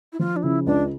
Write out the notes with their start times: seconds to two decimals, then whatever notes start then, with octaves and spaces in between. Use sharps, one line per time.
0.13 E4
0.19 F3 F4
0.36 D4
0.43 C#3 E4
0.67 C#2 D4